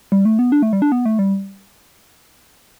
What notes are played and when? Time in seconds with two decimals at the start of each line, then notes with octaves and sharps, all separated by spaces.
0.12 G3
0.25 A3
0.39 B3
0.52 D4
0.62 A3
0.73 G3
0.82 D4
0.92 B3
1.06 A3
1.19 G3